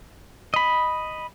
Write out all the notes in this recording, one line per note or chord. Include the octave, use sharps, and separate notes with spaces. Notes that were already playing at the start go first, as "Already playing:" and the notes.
D#5 B5